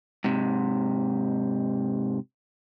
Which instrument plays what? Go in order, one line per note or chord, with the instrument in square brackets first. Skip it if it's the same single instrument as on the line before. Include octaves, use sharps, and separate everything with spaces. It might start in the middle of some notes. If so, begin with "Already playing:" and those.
[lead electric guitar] G#2 C3